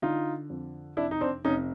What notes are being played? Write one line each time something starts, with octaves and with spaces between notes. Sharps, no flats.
D3 D#4 F4
F2
F1 D4 E4
D#4
C4 D4
F1 C#4 D#4